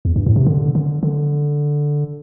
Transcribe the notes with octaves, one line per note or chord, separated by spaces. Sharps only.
E2
G2
A2
C3
D3
D3
D3